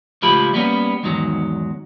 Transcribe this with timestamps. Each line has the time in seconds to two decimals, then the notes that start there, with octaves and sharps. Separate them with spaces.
0.22 C#2 A2 F3 E4 G4 B5
0.54 G3 A#3 B3 C#4
1.03 E2 G#2 D#3 F#3